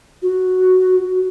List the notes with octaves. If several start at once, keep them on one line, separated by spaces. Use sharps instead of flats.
F#4